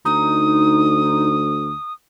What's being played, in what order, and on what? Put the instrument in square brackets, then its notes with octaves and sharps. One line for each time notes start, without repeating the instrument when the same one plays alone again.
[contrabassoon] D2 [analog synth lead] D#4 [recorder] D#6